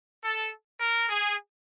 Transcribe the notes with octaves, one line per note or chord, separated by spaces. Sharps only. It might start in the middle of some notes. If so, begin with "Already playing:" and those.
A4
A#4
G#4